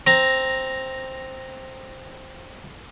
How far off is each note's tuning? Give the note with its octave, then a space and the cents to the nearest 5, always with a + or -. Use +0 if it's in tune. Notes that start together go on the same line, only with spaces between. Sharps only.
C4 +5 A#5 +0